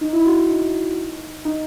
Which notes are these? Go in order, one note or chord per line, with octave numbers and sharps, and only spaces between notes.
D#4
E4
F#4
E4
D#4
D#4